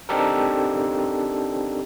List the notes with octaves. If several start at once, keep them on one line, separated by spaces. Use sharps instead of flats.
C4 D4 D#4 G4 A4 A#4